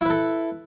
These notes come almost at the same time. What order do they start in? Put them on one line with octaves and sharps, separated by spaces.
E4 B4 A4